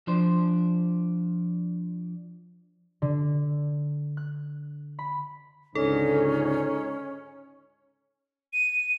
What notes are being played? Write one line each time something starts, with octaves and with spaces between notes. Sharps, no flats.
F3 D4 C5
D3
F#6
B5
C#2 G#2 D3 C#4 D#4 A4
D#7